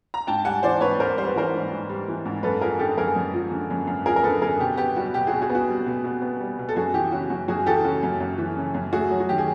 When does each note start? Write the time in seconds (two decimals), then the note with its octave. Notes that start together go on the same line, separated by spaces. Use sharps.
0.14 A#5
0.27 G#2 G5 A5
0.45 G3 F#5 G#5
0.63 E3 C5 D5
0.81 G#2 B4 C#5
0.99 G#2 A#4 C5
1.17 G3 C5
1.27 B4
1.36 E3 A#4 C5
1.54 G#2
1.72 G#2
1.90 G3
2.08 E3
2.25 G#2
2.43 F#2 A4 B4
2.61 F3 G#4 A#4
2.79 D3 G4 A4
2.97 F#2 G#4 A#4
3.16 F#2
3.33 F3
3.52 D3
3.70 F#2
3.87 F#2
4.06 F3 G#4 A#4
4.16 A#4
4.23 D3 A4 B4
4.42 F#2 G#4 A#4
4.59 B2 G4
4.77 B3 G4
4.96 G3 F#4
5.14 B2 G4
5.27 B2 F#4 G#4
5.42 F#4 G#4
5.49 B3
5.55 F#4
5.68 G3
5.86 B2
6.04 B2
6.22 B3
6.40 G3
6.59 B2
6.69 A4
6.76 F#2 F#4 G#4
6.94 E3 G4
7.12 C#3 F#4
7.30 F#2 F#4
7.48 F#2 F#4 G#4
7.66 E3 G4 A4
7.84 C#3 F#4
8.03 F#2
8.20 F#2
8.38 E3
8.57 C#3
8.74 F#2
8.93 A3 F#4 G#4
9.11 F#3
9.20 F#4
9.29 D#3 G4
9.38 G#4